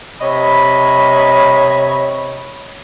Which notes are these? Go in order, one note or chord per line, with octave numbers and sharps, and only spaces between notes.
C3 C#5 D#5 B5